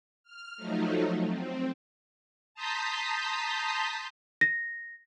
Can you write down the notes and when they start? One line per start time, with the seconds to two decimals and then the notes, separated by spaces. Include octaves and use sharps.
0.24 F6
0.56 F3 F#3 A3 D#4
1.26 C4
2.55 A5 A#5 C6 D#6 G6 B6
4.41 A#6